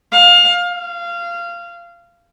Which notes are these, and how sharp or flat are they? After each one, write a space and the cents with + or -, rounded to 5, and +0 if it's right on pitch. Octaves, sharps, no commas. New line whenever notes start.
F5 +25
F5 -20